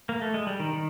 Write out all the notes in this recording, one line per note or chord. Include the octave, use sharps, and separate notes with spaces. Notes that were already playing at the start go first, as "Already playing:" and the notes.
A#3
A3
G#3
G3
D#3
D#3